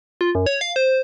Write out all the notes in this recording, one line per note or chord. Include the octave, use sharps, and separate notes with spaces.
F4
F#2
C#5
F5
C5